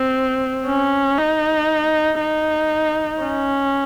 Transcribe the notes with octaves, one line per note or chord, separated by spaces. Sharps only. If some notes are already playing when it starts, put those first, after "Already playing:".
Already playing: C4
C#4
D#4
D#4
C#4